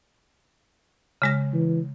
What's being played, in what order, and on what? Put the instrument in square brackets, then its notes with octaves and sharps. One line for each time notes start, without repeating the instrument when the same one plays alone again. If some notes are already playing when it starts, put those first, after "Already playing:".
[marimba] C#3 G#3 A#6
[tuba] E3